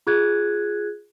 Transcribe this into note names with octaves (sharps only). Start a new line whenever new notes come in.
F4 G#4 F#6 G#6